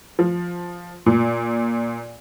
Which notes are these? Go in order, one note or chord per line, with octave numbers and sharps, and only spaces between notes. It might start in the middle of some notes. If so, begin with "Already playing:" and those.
F3
A#2